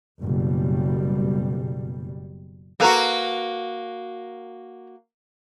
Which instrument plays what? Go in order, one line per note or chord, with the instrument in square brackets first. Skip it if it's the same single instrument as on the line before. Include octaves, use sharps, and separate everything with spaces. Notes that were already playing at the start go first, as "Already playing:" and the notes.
[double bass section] F#1 F#2 B2 G3
[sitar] A#3 F#4 [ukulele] A4 B4 A#5